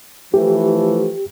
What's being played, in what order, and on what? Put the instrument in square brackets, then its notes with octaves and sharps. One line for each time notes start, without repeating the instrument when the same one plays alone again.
[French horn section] E3 F3 A3 [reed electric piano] G4